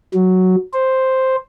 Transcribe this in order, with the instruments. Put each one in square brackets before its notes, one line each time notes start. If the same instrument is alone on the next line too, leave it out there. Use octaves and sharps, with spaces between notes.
[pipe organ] F#3
C5